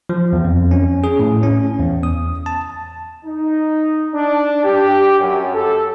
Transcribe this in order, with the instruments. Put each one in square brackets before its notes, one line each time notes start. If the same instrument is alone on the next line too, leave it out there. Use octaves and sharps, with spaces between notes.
[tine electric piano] F3
E2
F2
C#4
G#4
A2
C#4
E2
D#6
A5
[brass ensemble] D#4
D4
G4
F#2
A4